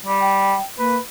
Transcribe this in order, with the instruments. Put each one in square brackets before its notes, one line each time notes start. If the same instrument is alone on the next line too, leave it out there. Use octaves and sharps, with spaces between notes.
[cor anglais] G3
[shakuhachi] G5
[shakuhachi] A#3 [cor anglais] B4